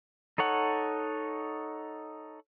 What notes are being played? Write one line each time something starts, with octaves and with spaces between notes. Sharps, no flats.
D#4 A4 C#5 F#5